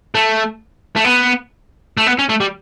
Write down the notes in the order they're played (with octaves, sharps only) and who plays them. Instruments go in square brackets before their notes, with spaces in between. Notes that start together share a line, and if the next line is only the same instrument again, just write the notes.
[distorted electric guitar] A3
A3
B3
A3
B3
C#4
A3
G3